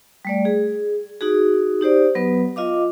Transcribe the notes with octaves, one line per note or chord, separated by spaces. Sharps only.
G3 A3 D5
G#4
D#4 F#4 G#4
D#4 G4 C5 D5
F#3 B3 B4
F4 D#5 F5 D6